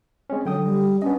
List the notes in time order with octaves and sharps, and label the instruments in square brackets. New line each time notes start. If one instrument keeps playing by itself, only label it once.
[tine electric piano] G#3 C4 C#4
[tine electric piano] D3 G5 D#6 [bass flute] F#3
[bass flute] G3
[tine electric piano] B3 D4 D#5 [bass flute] C#4